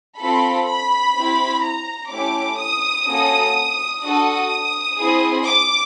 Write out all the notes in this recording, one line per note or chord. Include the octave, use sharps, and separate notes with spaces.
C4 F4 A4 B5
B5
C4 E4 G4
A#5
A3 C#4 E4 G4 D6
D#6
A#3 C#4 F#4 A4
D4 F#4 A4 D#6
C4 E4 G#4
D6